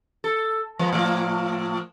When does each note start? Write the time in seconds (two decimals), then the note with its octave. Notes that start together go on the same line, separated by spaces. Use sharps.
0.24 A4
0.79 F3 G#3 B3
0.93 A2 F3 A#3